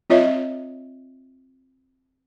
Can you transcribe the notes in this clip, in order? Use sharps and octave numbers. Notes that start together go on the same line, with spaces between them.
C4 F4 C#5 D#5 E5